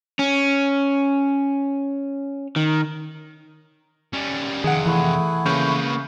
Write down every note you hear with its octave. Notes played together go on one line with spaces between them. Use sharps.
C#4
D#3
G3 C#4
F2 C3 D#3 G#4 F#5
E3 A3 E4
C#3 A#3 B4 C#6 G6